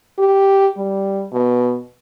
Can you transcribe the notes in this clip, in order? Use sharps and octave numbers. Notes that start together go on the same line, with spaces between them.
G4
G3
B2